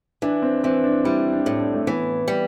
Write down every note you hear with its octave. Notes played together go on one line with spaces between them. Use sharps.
E3 D4
C4
E3 C4
D4
G3 E4
D4
A2
D4
A3
E3 B3
G3